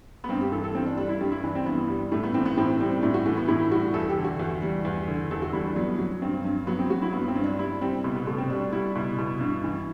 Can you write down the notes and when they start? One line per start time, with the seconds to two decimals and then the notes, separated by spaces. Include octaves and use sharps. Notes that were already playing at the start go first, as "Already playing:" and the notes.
0.24 B3
0.29 G2 C4
0.41 G4
0.52 E3 A4
0.64 A4
0.75 G2 C4
0.86 D4
0.97 G3 D4
1.09 E4
1.21 G2 G4
1.32 E4
1.43 E3 D4
1.55 C4
1.66 G2 B3
1.88 G3
2.12 A2 A3
2.23 B3
2.34 E3 C4
2.45 B3
2.57 A2 C4
2.80 G3 C4
3.03 A2 D4
3.14 F#4
3.25 E3 A3
3.37 B3
3.48 A2 E4
3.71 G3 F#4
3.94 E2 A4
4.09 G4
4.17 D3
4.24 F#4
4.40 E2
4.62 G3
4.85 E2
5.08 D3
5.31 E2 A4
5.42 F#4
5.53 G3 E4
5.65 D4
5.76 F#3 B3
5.99 F#3
6.22 G2 C4
6.45 G2
6.67 F#3 B3
6.79 C4
6.90 F#3 F#4
7.02 E4
7.12 G2 B3
7.28 C4
7.36 G2
7.44 D4
7.58 G3 E4
7.81 G3 C4
8.04 B2 B3
8.15 B3
8.27 B2 A3
8.38 C4
8.50 G3 D4
8.72 G3 E4
8.95 B2 E4
9.18 B2
9.41 G2
9.64 E3